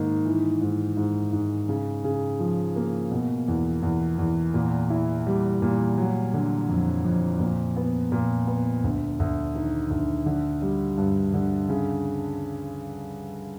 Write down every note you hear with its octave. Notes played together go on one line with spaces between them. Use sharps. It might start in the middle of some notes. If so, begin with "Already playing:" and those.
Already playing: G#2 D#3 A#3
E3
G#2
G#2
G#2
C#3
C#3
F3
A#3
B2
E2
E2
E2
A#2
E4
G3
A#2
F#3
D3
F2
F2
A#2
B3
A#2
B3
D2
D2
D#3
D2
D3
G3
G2
D3
C#3